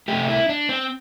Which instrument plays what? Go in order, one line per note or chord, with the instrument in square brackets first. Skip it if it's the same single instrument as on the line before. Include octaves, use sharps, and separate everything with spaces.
[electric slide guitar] C3 A3 G4
E4
D4
C4